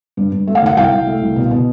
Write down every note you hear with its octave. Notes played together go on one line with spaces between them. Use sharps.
G2
G2
A3
F5
D#2 F#5
C2 F5 G5
C2
A3
C2
B2
B2